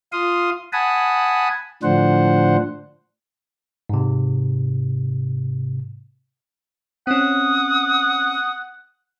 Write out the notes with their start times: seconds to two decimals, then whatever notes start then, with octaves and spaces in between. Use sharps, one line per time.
0.12 F4 F5 C6 D#6
0.73 F#5 G#5 A5 B5 D#6
1.83 A2 D3 F3 D4 C5 F#5
3.89 G#2 C3
7.07 C4 C#4 F#5 D#6